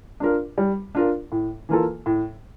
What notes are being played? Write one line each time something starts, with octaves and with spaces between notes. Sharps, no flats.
D4 F4 A#4
G3
D4 F4 A#4
A2
E3 A#3 F4 A4
A2